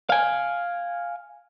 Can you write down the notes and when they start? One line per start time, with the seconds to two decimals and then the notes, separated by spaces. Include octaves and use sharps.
0.10 F5 G#5